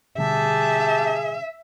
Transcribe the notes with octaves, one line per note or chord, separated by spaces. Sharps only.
B2 D3 G3 G4 G#4 E5 A5